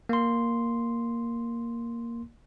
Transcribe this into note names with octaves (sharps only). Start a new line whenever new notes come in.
A#3 C6